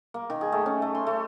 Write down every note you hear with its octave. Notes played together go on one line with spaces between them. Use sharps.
A#3
D#3
G#4
A3
C#4
A3
C6
A3